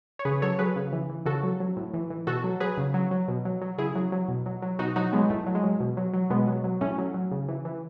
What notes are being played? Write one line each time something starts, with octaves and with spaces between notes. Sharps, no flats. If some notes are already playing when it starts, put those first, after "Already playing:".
C#5
C#3 G#4 B4
F#3 A4 C#5
F#3 G#4 B4
C#3
E3
E3
C#3 F#4 A4
F#3
F#3
A2
E3
E3
B2 F#4 A4
F#3
F#3 G#4 B4
C#3
F#3
F#3
B2
F#3
F#3
C#3 E4 G#4
F#3
F#3
B2
F#3
F#3
B2 D#4 F#4
F#3 D#4 F#4
F#3 G#3 B3
A2 A3
F#3
G#3
F#3
B2
F#3
F#3
B2 G#3 B3
F#3
F#3
A2 A3 C#4
F#3
F#3
C#3
E3
E3